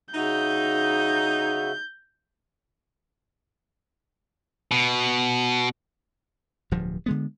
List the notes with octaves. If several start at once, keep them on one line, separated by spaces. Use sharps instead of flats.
C#3 D#4 F#4 E5 G6
B2
D1 G2 F3
D3 G#3 B3